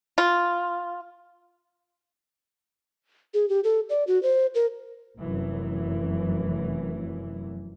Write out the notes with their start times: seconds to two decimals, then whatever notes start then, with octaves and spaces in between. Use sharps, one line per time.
0.18 F4
3.34 G#4
3.49 G4
3.64 A4
3.90 D5
4.07 F#4
4.23 C5
4.55 A#4
5.20 F1 F#2 E3